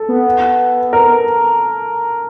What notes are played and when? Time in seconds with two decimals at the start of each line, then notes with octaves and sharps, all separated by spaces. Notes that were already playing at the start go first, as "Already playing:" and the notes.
Already playing: A4
0.09 B3
0.93 A#4